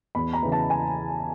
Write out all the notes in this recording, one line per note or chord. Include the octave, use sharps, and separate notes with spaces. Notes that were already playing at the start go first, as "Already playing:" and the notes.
E2 B5
A#5
C#3 E3
A5
G#5